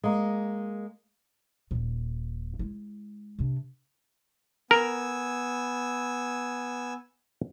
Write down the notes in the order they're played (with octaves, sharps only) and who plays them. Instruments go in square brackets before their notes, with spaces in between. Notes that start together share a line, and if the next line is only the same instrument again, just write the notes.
[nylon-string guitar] G#3 A#3
[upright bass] D#1 A#2
G#3 E4
C3 D4
[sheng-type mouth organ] B3 G#5 E6 [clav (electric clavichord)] A#4